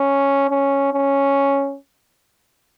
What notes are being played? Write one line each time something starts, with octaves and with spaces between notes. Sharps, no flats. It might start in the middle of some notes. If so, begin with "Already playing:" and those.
Already playing: C#4
C#4
C#4